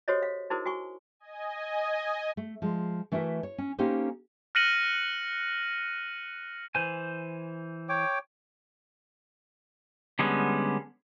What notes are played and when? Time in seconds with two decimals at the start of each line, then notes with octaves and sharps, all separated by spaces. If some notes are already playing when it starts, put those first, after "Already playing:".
0.08 F#4 G4 A4 C5 C#5 D#5
0.23 F5
0.50 D#4 E4 F#4 G#4 A#4 C5
0.66 F#4 G#5 C#6
1.20 D#5 G#5
2.37 A3
2.62 F3 G#3
3.12 E3 A3 E4 F#4 A#4
3.43 C#5
3.58 C#4
3.78 A#3 C#4 D#4 G4 A4 C5
4.55 F6 F#6 A#6 C#7 D#7 F#7
6.75 E3 C5 G#5
7.89 C#5 G5 D6
10.19 D3 G3 G#3 B3 C#4